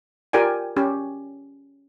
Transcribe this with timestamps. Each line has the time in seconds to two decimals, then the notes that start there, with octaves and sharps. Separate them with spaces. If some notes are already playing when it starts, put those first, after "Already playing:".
0.33 F4 G4 A#4 D5 G5 G#5
0.77 C#4 G4